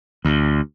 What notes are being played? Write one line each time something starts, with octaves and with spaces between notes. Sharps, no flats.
D2